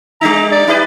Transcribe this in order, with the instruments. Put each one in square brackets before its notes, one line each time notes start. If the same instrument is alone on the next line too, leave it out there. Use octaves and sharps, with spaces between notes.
[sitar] G3 D4 D#4 [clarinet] A#5
[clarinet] D5
[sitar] D#4 G4 B4